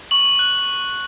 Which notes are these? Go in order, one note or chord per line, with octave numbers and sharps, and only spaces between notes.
C#6 F#7
F#6